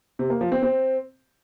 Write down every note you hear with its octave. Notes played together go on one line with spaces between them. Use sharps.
C3
A#3
F3
C4
C4